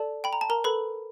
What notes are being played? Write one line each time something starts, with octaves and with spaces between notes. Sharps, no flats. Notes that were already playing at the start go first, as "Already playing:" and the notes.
Already playing: A4 D5 A5
G5 B5
A#5
A5
A#4 A#5
A4 B4 B5